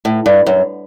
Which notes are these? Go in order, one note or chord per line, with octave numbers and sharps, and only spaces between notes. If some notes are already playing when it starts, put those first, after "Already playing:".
A2
G2
F#2